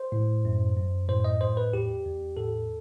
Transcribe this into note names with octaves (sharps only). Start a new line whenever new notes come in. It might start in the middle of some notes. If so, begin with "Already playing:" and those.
Already playing: C5
A2
F#2
F#2
A2 C5
D#5
A2 C5
B4
E2 G4
E2
A2 A4